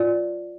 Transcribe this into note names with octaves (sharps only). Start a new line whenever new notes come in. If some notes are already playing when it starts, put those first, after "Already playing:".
Already playing: F4 D5